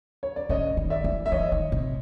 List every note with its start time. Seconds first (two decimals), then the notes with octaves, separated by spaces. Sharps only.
0.23 C#5
0.36 D5
0.49 C#3 C#5 D#5
0.77 D#3
0.90 D5 E5
1.04 E3
1.26 E5
1.32 E3 C#5 D#5
1.52 D#3
1.72 C3